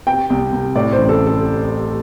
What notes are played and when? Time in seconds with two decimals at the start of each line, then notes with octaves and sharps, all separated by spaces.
0.07 C3 G5
0.30 C2
0.52 C2
0.75 A2 D5
0.93 C5
0.98 A1
1.09 A4
1.27 A4